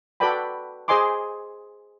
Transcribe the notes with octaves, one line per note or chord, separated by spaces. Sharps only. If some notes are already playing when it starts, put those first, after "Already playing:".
F#4 A4 B4 D5 G5 B5
G#4 C5 D#5 G#5 C6 D6